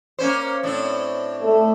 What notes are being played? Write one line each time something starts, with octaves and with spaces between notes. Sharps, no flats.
A#3 C#4 C5
A2 C4 D4
A3